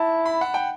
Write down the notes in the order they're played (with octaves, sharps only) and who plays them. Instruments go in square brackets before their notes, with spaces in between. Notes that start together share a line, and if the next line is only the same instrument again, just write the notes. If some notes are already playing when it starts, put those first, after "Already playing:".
Already playing: [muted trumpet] E4 [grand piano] A5
[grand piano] B5
F#5
G5